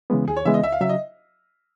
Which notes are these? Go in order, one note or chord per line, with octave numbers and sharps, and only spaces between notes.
C#3 E3 G#3 B3
D#2 G#4
C#5
C#3 E3 G#3 B3 E5
D#5
C#2 E5
F5
C#3 F#3 E5
D#5